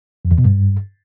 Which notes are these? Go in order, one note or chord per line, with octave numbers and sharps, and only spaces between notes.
F2
E2
B2
G2